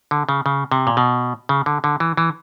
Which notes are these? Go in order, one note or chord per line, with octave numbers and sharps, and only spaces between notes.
D3
C#3
C#3
C3
A#2
B2
C#3
D3
D3
E3
E3